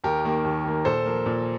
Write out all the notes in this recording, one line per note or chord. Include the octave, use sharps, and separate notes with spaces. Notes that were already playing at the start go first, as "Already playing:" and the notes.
D#2 G4 A#4
D#3 A#3
D#2
D#3 A#3
A#2 A4 C5
F3 A#3
A#2